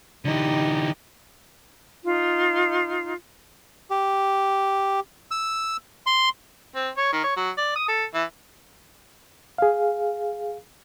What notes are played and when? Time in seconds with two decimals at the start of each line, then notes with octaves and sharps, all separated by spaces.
0.25 D3 E3 D#4 G4
2.04 D#4 F4
3.90 G4
5.31 E6
6.06 C6
6.75 C4
6.97 C#5
7.13 D#3
7.24 C#5
7.36 F#3
7.58 D5
7.76 D#6
7.88 A4
8.14 E3
9.58 G#4 F5